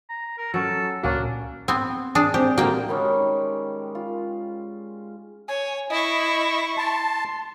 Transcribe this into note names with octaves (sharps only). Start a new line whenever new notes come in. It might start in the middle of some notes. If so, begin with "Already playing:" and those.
A#5
A#4
F#3 C#4 A4
C#2 A#2 A#3 C#4 D4 F#4
B3 C4
D4 G#4
C4 G4
D3 G3 A#3 F#4 G5
D#3 G3 G#3 C#4
F4
C#5 G#5
E4 D#5 C#6
A5 C6